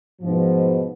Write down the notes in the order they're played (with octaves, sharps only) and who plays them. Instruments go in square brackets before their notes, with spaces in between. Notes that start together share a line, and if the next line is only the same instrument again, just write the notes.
[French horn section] G#2 B2 F3